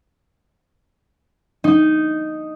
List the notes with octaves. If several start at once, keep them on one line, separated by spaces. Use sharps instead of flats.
D#4